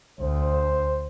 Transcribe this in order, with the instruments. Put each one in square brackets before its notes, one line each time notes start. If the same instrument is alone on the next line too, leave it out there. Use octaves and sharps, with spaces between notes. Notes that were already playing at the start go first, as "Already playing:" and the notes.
[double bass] D2 [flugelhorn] C5